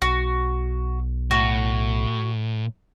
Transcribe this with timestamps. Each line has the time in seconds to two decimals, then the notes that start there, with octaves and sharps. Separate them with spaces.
0.02 B1 F#4
1.31 A2 F#4